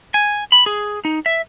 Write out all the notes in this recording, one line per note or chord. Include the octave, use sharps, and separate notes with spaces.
G#5
B5
G#4
D#4
E5